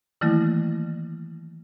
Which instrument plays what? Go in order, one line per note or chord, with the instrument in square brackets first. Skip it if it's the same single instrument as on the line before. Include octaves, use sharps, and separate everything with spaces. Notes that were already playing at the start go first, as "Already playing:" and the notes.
[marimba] D#3 E3 F#3 A3 A#3 E4